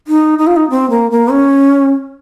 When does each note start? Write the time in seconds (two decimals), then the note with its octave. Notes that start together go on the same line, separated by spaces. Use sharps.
0.08 D#4
0.39 D#4
0.47 F4
0.56 D#4
0.70 C4
0.90 A#3
1.11 A#3
1.31 C#4